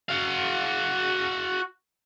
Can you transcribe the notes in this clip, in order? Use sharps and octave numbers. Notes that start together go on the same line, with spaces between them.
F#4 F5